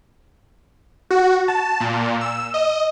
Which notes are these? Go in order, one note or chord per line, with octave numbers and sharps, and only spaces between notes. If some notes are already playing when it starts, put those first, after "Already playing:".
F#4
A5
A#2
E6
D#5